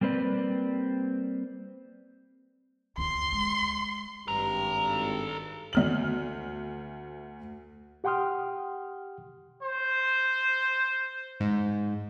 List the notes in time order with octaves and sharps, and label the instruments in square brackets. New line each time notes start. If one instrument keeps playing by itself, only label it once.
[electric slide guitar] G3 A#3 C4 B4 D5
[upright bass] D2 E4 [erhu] C6
[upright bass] G#3
[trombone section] G#1 G2 [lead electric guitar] A4 A#5
[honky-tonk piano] D2 F6 F#7
[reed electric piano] G4 F#5 G5 C6 D#6 F6
[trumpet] C5
[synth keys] G#2